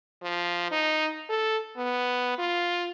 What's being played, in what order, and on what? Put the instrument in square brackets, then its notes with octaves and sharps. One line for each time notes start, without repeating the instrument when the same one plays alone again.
[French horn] F3
D#4
A4
B3
F4